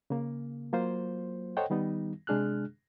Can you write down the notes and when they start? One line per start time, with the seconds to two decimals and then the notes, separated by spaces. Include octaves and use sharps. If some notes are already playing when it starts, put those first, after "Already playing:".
0.10 C#3 A#3
0.73 F#3 A#3 F4 C5
1.57 A4 C5 C#5 D#5 F#5 G5
1.70 D#3 G3 B3 D#4
2.27 C3 G#3 D4 G#4 F6 F#6